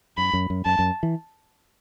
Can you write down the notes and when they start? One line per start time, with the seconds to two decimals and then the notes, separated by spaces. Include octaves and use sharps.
0.17 F#2 B5
0.33 F#2
0.50 F#2
0.66 F#2 A5
0.79 F#2
1.03 E3